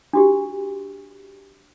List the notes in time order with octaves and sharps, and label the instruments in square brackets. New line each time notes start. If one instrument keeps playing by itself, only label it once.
[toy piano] D4 F#4 G4